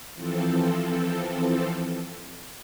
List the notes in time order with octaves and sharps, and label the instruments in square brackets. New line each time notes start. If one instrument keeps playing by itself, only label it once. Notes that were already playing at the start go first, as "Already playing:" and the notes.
[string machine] E3 F3 C4 A4